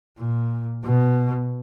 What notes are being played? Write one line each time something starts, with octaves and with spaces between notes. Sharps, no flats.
A#2
B2